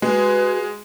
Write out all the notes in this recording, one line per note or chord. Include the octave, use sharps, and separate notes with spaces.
G#3 F#4 G#4 B4